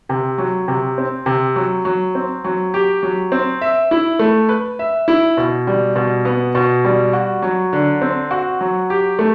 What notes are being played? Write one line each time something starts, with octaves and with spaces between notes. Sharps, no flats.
C3
F#3
C3
C4
C3
F#3
F#3
C4
F#3
G4
F#3
C4
E5
E4
A3
B4
E5
E4
B2
G3
B2
B3
B2
G3
F#4
F#3
D3
C4
F#4
F#3
G4
A3